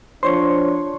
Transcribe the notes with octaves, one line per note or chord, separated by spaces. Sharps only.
F3 D4 C5 C#5 C6 C#6